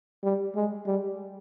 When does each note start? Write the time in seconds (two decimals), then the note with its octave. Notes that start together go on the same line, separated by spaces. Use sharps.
0.24 G3
0.56 G#3
0.87 G3